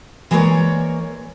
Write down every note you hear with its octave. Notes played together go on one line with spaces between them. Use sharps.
E3 G#3 A#3 A#4 C#5 D5